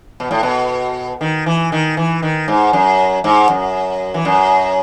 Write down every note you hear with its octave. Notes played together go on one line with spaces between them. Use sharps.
B2
A2
B2
D#3
E3
D#3
E3
D#3
G#2
F#2
G#2
F#2
E3
F#2